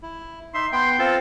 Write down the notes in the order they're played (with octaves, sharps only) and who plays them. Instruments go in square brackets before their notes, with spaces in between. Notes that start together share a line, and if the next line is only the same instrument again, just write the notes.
[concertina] E4
[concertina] D#4 E5 [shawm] C6
[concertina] B3 G5 [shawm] C6
[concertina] C4 F4 [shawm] A4